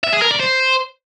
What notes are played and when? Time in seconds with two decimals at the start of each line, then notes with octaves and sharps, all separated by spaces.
0.04 E5
0.13 G#4
0.22 A#4
0.31 D5
0.40 C5